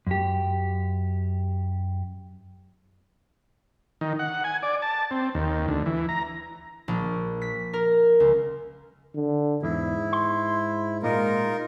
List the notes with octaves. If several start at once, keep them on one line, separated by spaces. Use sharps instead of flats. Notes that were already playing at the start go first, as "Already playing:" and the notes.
F#2 G4
D#3
F#5
G#5
D5
A5
C4
D#2
D2
E3
A#5
A#1
B6
A#4
C#2
D3
E2 G#2 E4
C6
A#2 G#3 D#4 F4 A#4